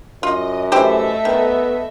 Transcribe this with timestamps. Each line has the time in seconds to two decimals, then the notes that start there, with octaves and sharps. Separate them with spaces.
0.23 F#2 F4 D#5
0.72 E3 A3 G4 C5 D#5 E5
1.25 D#3 B3